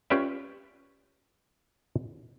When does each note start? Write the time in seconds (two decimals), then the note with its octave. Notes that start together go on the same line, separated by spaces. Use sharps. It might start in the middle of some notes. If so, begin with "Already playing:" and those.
0.10 C#4 F4 G4 B4 D5 E5